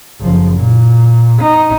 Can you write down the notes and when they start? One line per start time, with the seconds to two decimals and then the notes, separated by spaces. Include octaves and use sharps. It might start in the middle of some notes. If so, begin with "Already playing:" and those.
0.21 F#1 F3
0.56 A#2
1.42 D#4